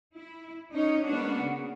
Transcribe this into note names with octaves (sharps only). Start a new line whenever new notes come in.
E4
C#4 D#4 C#5
G#3 A#3 B3 C#4 D4 F#4
C#3